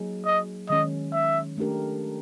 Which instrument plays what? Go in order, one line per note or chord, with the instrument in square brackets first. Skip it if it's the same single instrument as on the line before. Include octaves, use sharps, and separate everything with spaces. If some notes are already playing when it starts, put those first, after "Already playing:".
Already playing: [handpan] F#3 A#3 D#4 G#4
[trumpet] D#5
[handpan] D#3 G#3 C#4 [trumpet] D#5
[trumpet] E5
[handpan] A3 D4 G4 A#4